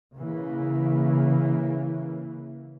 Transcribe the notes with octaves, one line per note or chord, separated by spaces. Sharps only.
C#3 E3 A#3